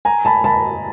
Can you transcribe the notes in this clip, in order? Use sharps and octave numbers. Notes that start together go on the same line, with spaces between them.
G#5 A#5
A5 B5
A5 B5